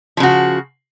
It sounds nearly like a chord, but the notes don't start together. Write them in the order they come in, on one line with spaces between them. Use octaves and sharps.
F3 C#3 F#4